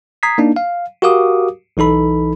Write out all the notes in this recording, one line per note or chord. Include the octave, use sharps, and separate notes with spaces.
A#5 D#6 G#6 B6 C7
A#3 D4 D#4
F5
F#4 G4 A#4 F5 D6 D#6
B1 E3 D#4 A4 B5